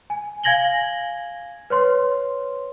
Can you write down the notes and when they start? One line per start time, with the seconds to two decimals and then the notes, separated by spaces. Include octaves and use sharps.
0.10 G#5
0.43 F5 G#5 G#6 A#6 F#7 G7
1.70 B4 C#5 C6